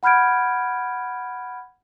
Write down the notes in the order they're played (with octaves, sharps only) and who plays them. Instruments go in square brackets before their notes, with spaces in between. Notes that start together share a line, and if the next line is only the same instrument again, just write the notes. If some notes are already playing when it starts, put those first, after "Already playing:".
[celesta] F#5 B5 F6 G6 G#6 D7